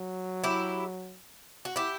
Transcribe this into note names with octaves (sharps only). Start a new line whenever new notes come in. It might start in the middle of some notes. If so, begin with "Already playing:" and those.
Already playing: F#3
E4 G4
F#4
E4 G4